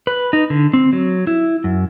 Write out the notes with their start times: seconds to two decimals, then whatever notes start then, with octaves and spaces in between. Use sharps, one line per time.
0.07 B4
0.33 D#4
0.50 D3
0.73 C4
0.93 F#3
1.27 E4
1.64 F#2